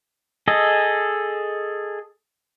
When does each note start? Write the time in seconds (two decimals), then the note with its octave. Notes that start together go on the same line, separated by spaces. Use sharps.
0.48 G#4 A4 D#5